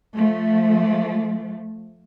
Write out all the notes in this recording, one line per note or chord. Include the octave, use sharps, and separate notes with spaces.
F3 A3